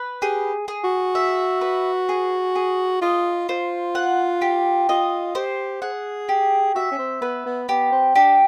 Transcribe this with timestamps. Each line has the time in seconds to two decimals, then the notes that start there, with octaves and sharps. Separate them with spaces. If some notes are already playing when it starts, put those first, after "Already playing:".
Already playing: B4
0.22 G4 G#4
0.68 G#4
0.84 F#4
1.15 E5
1.61 B4
2.09 G#4
2.55 G#4
3.01 F4 D#5
3.49 F4 C5
3.95 F#5
4.42 G4
4.89 F4 D#5
5.35 G4 C5
5.82 G#4 F#5
6.29 G4
6.75 F#4 E5
6.91 C#4
6.99 C4
7.21 B3 B4
7.46 B3
7.69 B3 G4
7.92 C4
8.15 D4 G4